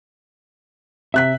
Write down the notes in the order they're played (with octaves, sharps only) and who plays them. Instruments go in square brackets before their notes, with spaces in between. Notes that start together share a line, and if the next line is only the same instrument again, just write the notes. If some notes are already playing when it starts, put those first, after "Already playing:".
[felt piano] C3 F#6 B6 [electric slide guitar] E5